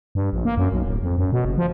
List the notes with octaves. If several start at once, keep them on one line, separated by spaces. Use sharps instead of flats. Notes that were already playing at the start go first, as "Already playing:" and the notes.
G2
A#1
A#3
F#2
B1
D1
F2
F#2
B2
F#1
F3